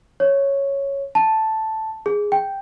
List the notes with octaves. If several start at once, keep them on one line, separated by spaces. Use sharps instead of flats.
C#5
A5
G#4
G5